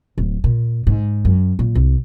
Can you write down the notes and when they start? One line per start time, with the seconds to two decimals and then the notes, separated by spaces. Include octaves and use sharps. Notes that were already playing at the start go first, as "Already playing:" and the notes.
0.18 D1
0.44 A#2
0.87 G#2
1.25 F#2
1.59 A#2
1.75 C2